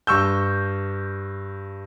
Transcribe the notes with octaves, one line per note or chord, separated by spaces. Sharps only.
G2 C#6 E6 G6